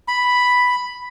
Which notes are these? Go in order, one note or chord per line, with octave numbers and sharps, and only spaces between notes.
B5